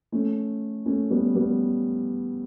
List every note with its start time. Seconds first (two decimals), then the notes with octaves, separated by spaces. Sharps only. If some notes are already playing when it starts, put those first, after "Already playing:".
0.12 A3 C#4
0.86 A3 C#4
1.10 G3 B3
1.35 G3 B3